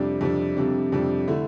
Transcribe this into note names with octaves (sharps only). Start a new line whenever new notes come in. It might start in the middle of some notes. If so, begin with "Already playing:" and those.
Already playing: F2 C3 G3 D4
F2 C3 G3 D4
F2 C3 G3 D4
F2 C3 G3 D4
D3 A3 E4